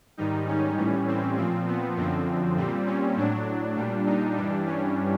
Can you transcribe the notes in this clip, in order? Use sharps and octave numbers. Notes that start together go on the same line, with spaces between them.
G#2 D#3 G3 D#4
C#4
A2 E3 G3
C4
A#2 F3 C4
B3
F#2 D3 F3 C4
A#2 G3 C4
C#4
A2 F#3 D4
A#2 G3
D#4
G2 E3 G3 D4
C#4